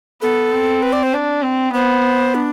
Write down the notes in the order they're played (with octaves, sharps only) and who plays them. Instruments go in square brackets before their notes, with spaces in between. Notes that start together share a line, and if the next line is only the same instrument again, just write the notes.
[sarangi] B3 [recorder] A4
[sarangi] C4
[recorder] B4
D5
C5
[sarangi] D4
C4
[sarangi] B3 [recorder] C5
[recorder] D4